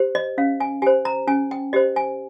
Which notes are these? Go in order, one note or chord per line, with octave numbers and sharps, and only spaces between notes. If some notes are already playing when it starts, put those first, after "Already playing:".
Already playing: G4 C5
D#5
C#4 F5
G#5
G4 C5 G#5
A#5
C#4 G#5
G5
G4 C5 D#5
G#5